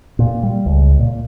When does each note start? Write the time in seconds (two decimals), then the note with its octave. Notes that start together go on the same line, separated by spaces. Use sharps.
0.19 A#2
0.43 G3
0.66 C#2
0.99 A#2